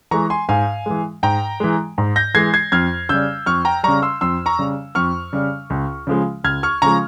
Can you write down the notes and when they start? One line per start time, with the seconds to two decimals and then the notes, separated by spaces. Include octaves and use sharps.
0.11 E3 G#3 A#5 C#6
0.30 G#5 C6
0.49 G#2 F5 G#5
0.86 E3 G#3
1.23 G#2 G5 A#5
1.60 E3 G#3
1.98 G#2
2.16 G6 A#6
2.34 E3 G#3 G#6 C7
2.54 G#6 C7
2.72 F2 F6 G#6
3.09 C#3 G3 E6 G6
3.46 F2 C#6 F6
3.65 G5 A#5
3.83 C#3 G3 A#5 C#6
4.02 C6 E6
4.21 F2 C6 E6
4.46 A#5 C#6
4.59 C#3 G3
4.95 F2 C#6 F6
5.33 C#3 G3
5.70 C#2
6.07 C#3 F3 G#3
6.44 C#2 F6 G#6
6.63 C#6 F6
6.82 C#3 F3 G#3 A#5 C#6